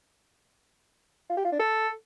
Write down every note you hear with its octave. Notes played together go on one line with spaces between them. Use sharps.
F4
G4
F4
D4
A4